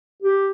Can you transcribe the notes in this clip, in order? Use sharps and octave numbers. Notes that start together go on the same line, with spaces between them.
G4